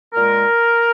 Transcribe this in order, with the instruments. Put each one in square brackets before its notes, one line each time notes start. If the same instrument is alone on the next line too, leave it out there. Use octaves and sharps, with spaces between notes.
[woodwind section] A#2 G#3 A#4